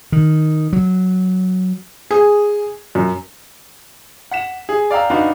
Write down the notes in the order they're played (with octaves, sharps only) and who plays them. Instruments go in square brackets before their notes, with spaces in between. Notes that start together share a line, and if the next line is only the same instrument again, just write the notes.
[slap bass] D#3
F#3
[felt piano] G#4
F#2
[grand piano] F#5 B6 E7
G#4
D5 F5 G5 A#5 E6
B3 D4 D#4 F#4 F5